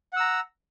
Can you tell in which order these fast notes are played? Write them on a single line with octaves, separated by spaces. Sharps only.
F#5 E6 A#5